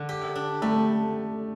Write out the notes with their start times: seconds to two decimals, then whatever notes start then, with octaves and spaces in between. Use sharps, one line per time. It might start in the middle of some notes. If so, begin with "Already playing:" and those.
Already playing: D3
0.09 G4
0.36 D4
0.62 G3 A3